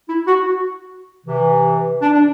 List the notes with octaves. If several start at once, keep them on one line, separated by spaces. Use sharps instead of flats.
E4
F#4
C3 E3
D4
D4